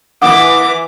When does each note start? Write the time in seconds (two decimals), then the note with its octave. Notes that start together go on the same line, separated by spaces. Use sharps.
0.22 E3 F#5 D6 D#6